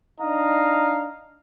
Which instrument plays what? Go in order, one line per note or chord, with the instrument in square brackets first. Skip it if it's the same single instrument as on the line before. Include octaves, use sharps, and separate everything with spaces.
[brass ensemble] D4 D#4 D#5 F5 A#5